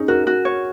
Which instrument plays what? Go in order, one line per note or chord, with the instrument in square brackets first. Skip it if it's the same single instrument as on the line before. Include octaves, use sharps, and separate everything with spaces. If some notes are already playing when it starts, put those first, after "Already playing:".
Already playing: [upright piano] C#4 G#4 [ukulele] D#4
[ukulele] F#4 [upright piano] A#4
[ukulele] F#4
C#5